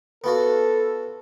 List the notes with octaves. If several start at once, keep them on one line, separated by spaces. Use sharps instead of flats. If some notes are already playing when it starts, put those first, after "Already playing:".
B3 F4 F#4 A4